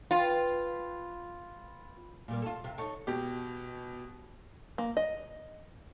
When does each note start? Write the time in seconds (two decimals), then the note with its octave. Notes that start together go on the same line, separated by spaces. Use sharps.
0.11 F4 B4 G5
2.28 A#2 G3 A#3
2.42 F4 A4
2.64 C3 F4
2.78 D#4 A4 C#5
3.07 B2 G4
4.78 A#3
4.97 D#5